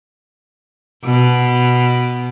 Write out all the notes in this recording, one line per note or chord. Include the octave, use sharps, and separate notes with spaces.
B2